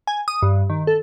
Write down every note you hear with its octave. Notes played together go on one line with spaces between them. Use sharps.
G#5
D#6
G2
D#3
A4